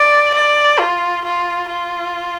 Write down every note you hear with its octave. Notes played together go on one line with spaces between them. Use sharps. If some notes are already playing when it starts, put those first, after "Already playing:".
Already playing: D5
D5
F4
F4
F4